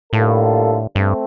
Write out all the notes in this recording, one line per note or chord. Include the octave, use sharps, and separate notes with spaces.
A2 D3 G3 A#3 F4 A4
G2 A3 C4